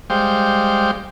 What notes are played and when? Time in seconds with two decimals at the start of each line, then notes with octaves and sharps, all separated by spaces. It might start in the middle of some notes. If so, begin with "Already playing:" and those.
0.10 G3 G#3 C5 F5 G5